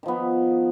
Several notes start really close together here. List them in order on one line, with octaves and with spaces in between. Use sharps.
D#3 F3 B3